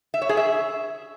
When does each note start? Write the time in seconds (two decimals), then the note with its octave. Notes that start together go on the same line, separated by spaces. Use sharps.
0.14 E5
0.22 C#5
0.29 G#4
0.37 E5